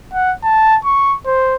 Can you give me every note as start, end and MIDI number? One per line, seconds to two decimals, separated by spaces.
0.14 0.34 78
0.44 0.78 81
0.85 1.16 85
1.26 1.56 72